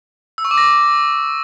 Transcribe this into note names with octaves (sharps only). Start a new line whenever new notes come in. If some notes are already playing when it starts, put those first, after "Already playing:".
E6
C#6
D6
A#6